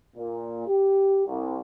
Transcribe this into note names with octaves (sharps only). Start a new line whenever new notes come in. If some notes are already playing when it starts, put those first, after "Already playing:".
A#2
G4
C2